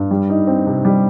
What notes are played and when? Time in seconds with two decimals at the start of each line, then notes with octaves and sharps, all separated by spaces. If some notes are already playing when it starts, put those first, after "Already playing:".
Already playing: G2
0.11 G3
0.29 D#4
0.47 C4
0.67 C3
0.85 G3